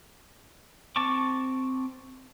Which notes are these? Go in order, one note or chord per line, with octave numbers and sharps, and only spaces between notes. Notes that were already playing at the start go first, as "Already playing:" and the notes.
C4 A5 C#6 D6